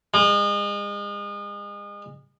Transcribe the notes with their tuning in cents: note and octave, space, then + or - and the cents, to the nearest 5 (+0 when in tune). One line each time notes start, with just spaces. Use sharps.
G#3 -35